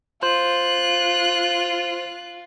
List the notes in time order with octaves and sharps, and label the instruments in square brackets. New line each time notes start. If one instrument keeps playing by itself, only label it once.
[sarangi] F4 [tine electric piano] C5 [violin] F#6